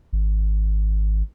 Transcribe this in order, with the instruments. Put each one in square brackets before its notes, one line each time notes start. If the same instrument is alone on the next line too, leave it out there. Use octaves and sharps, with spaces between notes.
[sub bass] G#1